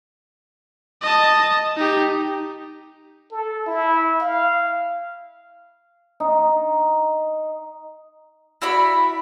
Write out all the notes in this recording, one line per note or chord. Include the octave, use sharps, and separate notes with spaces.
D#5 A5
D#4 G4
A4
E4
F5
D#4
E4 F#4 D5 B5